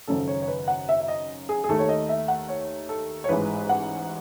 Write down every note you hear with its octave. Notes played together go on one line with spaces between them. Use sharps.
G#1 F#2 C#3 A4
C#5
C#5
B4
F#5
E5
E5
D#5
G#4
G#4
D#2 D#3 A3 A4
C#5
D#5
E5
F#5
C#5
A4
C#5
A1 G#2 E3 G#3 B4
F#5